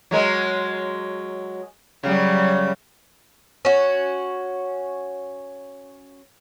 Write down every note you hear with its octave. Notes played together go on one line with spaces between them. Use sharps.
F#3 G#3 A#4
C#3 F#3 G3
C#4 F#4